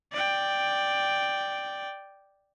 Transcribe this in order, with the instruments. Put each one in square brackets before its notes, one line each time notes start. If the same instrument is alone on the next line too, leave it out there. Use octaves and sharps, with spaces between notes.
[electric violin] D5 G5